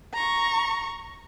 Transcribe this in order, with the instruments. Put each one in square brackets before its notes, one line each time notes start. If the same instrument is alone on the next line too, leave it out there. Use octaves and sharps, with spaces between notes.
[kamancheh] A#5 C#6